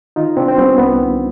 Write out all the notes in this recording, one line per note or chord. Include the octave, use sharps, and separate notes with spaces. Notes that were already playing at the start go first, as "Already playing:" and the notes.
D#3 D#4 F4
C3 C4 D4
C4
G3 B3 C#4
C2 B3
D#3